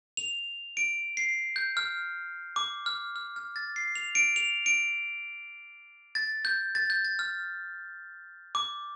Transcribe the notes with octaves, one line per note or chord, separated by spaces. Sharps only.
F7
D7
C7
G6
F6
D6
F6
F6
F6
A6
C7
F7
D7
F7
D7
A6
G6
A6
G6
A6
F6
D6